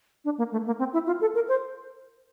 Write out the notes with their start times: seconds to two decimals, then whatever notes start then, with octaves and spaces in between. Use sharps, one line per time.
0.25 D4
0.38 A#3
0.52 A3
0.66 A#3
0.79 C4
0.93 E4
1.07 F4
1.21 A4
1.35 A#4
1.48 C5